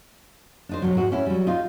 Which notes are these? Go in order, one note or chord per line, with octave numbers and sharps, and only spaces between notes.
D4 D#4 C5
C3 F3 F#3
G#2 F#4
C#4 E4
F#3 G3
D#4 F4